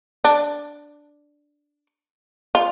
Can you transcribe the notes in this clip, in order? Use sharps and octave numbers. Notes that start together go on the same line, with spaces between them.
D4
F4